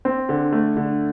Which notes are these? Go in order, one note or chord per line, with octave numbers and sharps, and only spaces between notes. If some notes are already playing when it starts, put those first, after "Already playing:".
C4
D3
A3
D3